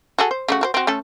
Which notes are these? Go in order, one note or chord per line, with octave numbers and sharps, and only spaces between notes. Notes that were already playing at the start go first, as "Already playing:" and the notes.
F#4 G#4 A4
C5
C#3 A3 F#4
F#4 A#4 C5
C4 F#4
A3 C#4 A4